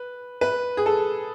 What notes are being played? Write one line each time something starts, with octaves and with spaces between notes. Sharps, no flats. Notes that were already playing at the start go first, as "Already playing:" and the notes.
Already playing: B4
B4
G#4
A4